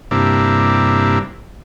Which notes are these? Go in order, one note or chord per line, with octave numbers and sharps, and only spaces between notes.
G2 C3 A#3 D4 E4